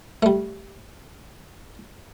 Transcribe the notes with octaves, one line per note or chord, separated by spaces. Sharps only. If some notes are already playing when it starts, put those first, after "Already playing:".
G3 A3